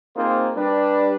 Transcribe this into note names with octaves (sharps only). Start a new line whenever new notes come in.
A#3 C4 D#4 F4 G#4 C5
G3 D4 B4